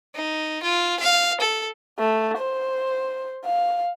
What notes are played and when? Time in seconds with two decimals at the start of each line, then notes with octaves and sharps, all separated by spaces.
0.15 D#4
0.63 F4
1.00 F5
1.41 A4
1.99 A3
2.38 C5
3.46 F5